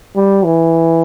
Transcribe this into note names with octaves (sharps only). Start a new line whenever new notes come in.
G3
E3